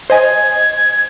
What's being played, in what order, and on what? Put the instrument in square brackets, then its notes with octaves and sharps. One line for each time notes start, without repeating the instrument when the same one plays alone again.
[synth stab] C5 D#5 G#5 [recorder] G#6